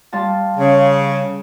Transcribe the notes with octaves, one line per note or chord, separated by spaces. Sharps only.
G3 F4 A5
C#3